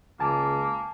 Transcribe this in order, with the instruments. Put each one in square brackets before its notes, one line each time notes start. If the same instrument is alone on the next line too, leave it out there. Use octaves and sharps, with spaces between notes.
[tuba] C#2 [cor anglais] A#3 [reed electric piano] G#5 A5 D6